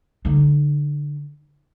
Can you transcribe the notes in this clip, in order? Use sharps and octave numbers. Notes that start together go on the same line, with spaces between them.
D3 D#4